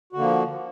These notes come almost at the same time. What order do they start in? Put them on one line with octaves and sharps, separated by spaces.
F#4 D3 A#3 F3